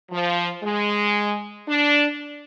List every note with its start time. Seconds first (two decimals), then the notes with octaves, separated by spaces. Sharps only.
0.11 F3
0.63 G#3
1.68 D4